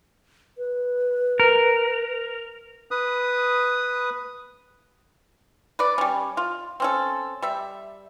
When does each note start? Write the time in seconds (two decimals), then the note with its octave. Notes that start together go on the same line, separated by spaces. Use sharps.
0.58 B4
1.40 A#4
2.91 B4 D#6
5.79 B4 D5
5.98 G3 C#4
6.37 F4
6.80 C4 C#4 A4
7.42 G3 E5